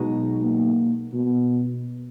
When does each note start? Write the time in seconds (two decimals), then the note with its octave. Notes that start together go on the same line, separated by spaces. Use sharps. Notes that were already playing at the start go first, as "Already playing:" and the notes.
Already playing: B1 B2 G#3 D#4 F#4
0.42 A#3
1.14 B2